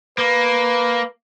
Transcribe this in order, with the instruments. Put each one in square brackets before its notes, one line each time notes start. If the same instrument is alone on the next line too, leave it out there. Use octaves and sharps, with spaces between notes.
[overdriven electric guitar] A#3 [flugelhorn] B4